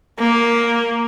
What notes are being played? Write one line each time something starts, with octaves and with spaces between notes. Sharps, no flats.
A#3